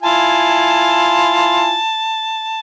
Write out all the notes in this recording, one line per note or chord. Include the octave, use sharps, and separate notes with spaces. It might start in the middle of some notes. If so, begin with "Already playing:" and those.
E4 F4 G#5 A5